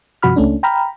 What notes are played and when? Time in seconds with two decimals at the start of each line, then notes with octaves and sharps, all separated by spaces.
0.22 G2 C3 F3 F#4 B5 F6
0.36 C#2 A3 C#4 D4
0.63 G5 A#5 B5 F6